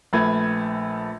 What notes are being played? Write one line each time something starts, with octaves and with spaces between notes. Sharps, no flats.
A#1 A3 B4 G#6